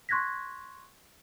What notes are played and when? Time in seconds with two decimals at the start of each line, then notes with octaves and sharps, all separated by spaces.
0.09 C6 C#6 F#6 G#6 A#6 B6